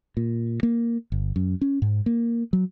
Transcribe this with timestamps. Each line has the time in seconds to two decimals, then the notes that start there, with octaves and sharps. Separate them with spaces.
0.17 A#2
0.63 A#3
1.12 G1
1.36 F#2
1.61 C#4
1.82 G#2
2.06 A#3
2.53 F#3